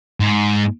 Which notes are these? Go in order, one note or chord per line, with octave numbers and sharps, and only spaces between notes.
G#2